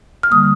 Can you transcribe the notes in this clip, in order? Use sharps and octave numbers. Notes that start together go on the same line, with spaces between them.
F6
D3 G3 A#3 D#6